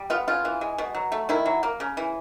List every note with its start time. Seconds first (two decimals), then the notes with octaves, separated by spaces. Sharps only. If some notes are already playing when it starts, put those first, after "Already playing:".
Already playing: G3
0.10 B3 F4
0.28 C#3 F4
0.45 E3
0.61 G#3
0.78 B2
0.95 F#3
1.12 A3
1.29 D#3 E4
1.46 F#3
1.63 A#3
1.80 C#3
1.97 E3